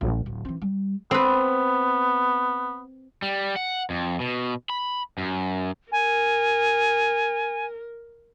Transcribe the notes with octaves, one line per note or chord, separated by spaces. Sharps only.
A1
D1
E3 C4
G3
B3 C4 B4
G3
F#5
F2
B2
B5
F#2
A#4 G#5